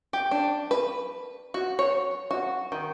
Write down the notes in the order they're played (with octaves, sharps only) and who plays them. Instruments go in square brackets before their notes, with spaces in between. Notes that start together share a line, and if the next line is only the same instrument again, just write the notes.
[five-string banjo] G4
D4
B4
F#4
C#5
F#4
D#3